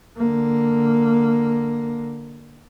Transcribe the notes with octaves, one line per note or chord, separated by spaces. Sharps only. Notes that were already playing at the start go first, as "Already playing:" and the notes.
D3 A#3